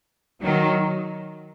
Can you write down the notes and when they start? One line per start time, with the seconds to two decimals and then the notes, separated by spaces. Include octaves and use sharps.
0.43 D#3 F#3